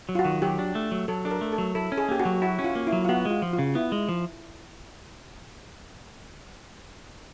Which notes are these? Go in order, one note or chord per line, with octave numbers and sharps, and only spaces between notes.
F#3
F4
F#4
D#3
F#3 G4
D4
A3
F#3
F#3 A4
D4 A4
A#4
A3
A4
F#3
E4 A4
C#4
G#4
A#3 G4
F#4
F#3
E4 F#4
C#4
F4
A#3
E4
F#3
F4
B3 F#4
G#3
F4
F3
F4
C#3
B3 E4
G#3
F3